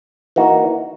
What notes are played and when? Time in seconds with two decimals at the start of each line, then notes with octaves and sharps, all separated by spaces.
0.36 E3 A#3 D#4 F#4